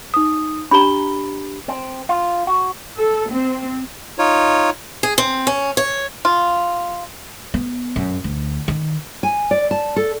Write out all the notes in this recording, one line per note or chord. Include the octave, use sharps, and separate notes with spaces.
D#4 D#6
D4 G4 A#5 B5 G7
C4
F4
F#4
A4
C4
D#4 F4 C#5
G#4
C4
C#4
C#5
F4
B3
F#2
D2
D#3
G#5
D5
A5
A4